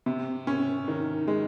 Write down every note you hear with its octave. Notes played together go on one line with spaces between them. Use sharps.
C3
C#4
D#3
G#3